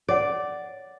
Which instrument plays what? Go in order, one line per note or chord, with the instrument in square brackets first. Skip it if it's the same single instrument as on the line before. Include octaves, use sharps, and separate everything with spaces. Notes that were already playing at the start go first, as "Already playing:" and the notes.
[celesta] C#5 F#5 [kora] D5